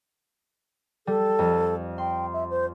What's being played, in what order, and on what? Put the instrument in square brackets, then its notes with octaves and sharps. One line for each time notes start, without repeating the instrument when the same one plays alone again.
[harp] G3 [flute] A4
[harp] F2
[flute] G5 [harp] C6
[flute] E5
C5